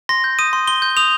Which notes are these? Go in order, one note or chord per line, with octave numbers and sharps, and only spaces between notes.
C6 A#6
G6
D#6 D#7
C6
C6 G7
G6
D#6 F7